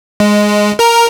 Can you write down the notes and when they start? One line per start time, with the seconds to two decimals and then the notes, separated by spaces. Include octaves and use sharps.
0.20 G#3
0.79 A#4 A#5